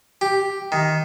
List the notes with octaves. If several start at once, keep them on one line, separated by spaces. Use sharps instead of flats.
G4
D#3